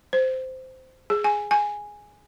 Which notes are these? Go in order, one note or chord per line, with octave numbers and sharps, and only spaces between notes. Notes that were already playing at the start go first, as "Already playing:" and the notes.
C5
G#4
G#5
G#5